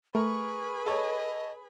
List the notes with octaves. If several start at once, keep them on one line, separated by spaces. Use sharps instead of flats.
A3 G#4 A#4 B4 B5 C#6
A4 C#5 D#5